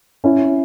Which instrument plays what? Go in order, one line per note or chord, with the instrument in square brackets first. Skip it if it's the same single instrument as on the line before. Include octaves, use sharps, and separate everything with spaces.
[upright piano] C#4 E4